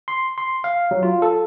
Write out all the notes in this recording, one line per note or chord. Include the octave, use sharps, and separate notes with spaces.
C6
C6
F5
F#3
F4
A4